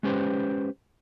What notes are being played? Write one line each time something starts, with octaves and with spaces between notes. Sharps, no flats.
G#3 C#4 G4 B4 C5